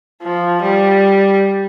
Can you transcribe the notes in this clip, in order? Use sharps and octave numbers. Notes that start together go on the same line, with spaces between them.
F3
G3